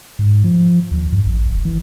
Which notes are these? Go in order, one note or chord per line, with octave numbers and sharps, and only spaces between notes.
G#2
F3
D#2
G2
A1
F#1
E3